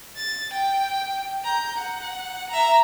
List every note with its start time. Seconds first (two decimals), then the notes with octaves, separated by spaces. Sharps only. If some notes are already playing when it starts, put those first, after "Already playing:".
0.17 A6
0.53 G5
1.44 A#5 G6
1.78 F#5
2.50 E5 A#5